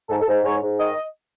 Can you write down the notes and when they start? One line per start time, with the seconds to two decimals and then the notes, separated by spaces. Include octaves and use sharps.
0.10 G#2 A4
0.21 A4
0.28 G#2
0.44 G#2 C#5
0.61 G#2
0.80 D#3 D#5